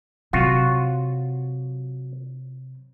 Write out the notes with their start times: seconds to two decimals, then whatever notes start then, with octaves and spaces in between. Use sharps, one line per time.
0.33 C3 F#3 F4 F#4